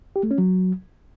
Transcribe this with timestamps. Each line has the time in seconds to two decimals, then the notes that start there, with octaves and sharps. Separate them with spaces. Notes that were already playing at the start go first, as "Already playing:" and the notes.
0.16 G4
0.23 A3
0.31 C#4
0.38 F#3